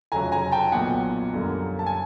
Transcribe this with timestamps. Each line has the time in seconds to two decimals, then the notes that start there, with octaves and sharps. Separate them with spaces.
0.12 F1 F2 C#3 F#3 G#5 A#5
0.32 G#5 A#5
0.51 G5 A5
0.72 B1 A#2 F#3 B3 F#5 G#5
1.34 F#2 D3 G3 A#3
1.79 A5
1.86 G#5